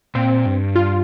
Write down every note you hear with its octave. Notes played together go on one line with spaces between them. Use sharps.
A#2 C4
G2
F4